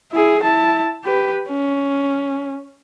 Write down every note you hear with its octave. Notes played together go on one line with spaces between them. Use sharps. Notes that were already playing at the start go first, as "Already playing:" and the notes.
E4 G#4
E4 A5
G4 B4
C#4